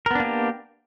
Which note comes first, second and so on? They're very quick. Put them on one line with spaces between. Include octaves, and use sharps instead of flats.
A#4 B3 D4 A#3 G4